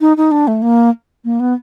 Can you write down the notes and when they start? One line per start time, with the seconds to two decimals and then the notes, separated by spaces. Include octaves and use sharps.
0.01 D#4
0.17 D#4
0.31 D4
0.48 A3
0.62 A#3
1.25 A#3
1.40 B3